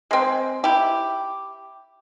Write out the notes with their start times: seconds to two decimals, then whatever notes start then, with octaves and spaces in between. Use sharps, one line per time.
0.11 G#3 C4
0.64 E4 G4